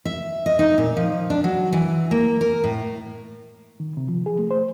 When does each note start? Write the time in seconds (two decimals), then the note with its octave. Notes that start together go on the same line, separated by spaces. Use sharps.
0.05 E5
0.46 D#5
0.59 D#4
0.78 A#2
0.97 F3
1.30 D4
1.44 F#3
1.72 E3
2.11 A#3
2.41 A#4
2.64 A2
3.80 D#3
3.97 C3
4.09 F3
4.26 G#4
4.39 A3
4.51 C5